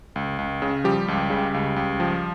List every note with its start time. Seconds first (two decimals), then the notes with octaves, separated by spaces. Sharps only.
0.16 C#2
0.39 C#2
0.62 C#3
0.84 F3 G3 G4
1.08 C#2
1.30 C#3
1.54 C#2
1.76 C#2
2.00 F3